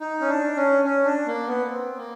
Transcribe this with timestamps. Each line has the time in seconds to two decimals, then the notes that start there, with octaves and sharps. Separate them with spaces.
0.01 D#4
0.21 C#4
0.28 D4
0.57 C#4
0.84 C#4
1.05 D4
1.26 A#3
1.47 B3
1.69 C4
1.97 A#3